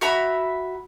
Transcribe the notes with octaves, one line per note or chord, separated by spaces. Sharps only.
F#4 E5 A#5 B5